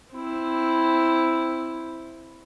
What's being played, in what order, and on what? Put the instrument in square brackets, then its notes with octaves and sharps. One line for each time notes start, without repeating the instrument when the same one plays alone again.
[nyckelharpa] C4 E4